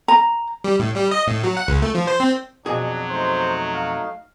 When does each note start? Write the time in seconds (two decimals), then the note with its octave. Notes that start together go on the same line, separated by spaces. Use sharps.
0.08 A#5
0.64 G3
0.79 A2
0.96 G3
1.11 D#5
1.27 A2
1.44 F#3
1.57 F#5
1.68 C#2
1.82 A3
1.95 F3
2.07 C5
2.20 C4
2.66 F2 B2 F#3 D4 G#4
3.10 A3 D#4 C5
3.74 F5